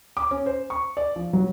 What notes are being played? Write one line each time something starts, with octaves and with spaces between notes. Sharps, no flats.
D6
C#4
C5
C#6
D5
F3
F#3